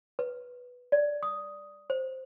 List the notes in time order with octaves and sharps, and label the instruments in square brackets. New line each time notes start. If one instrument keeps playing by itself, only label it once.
[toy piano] B4
D5
D#6
C5